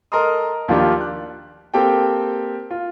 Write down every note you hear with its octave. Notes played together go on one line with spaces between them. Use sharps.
A4 A#4 D#5 A#5 C6 D#6
D#2 F3 A#3 D4 F4 G4
F#6
A#3 C4 G4 A4 G5
F4